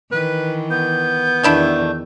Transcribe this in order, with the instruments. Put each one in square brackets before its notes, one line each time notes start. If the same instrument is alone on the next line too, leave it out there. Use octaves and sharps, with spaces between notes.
[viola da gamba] D#3 E3 [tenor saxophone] B4
[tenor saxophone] B3 [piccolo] G6
[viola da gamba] E2 D#3 [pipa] A3 D4 E4